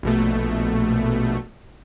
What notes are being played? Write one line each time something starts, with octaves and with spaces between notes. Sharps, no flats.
A#1 B2 A3